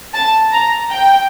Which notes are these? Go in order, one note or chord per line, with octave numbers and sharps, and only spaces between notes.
A5
A#5
G5